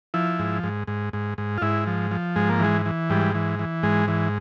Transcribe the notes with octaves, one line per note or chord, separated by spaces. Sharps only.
F3 E4
G#2
G#2
G#2
G#2
G#2
F4
G#2 E4
F3
F3
G#2 G#3
A#3
E3 G#3
E3
G#2 G3
E3
E3
G#2 G#3
E3